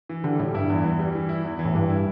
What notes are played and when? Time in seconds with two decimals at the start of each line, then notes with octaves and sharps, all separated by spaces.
0.09 E3
0.24 D3 G3
0.39 A2 G3
0.54 G2 E4
0.70 E2
0.84 E3
0.99 G3
1.15 E3
1.29 E4
1.44 E2
1.59 E3
1.65 A2
1.74 G2 G3
1.90 E4